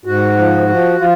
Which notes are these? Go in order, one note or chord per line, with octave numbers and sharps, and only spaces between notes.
G#2 F#4
F3
F3
F3 F4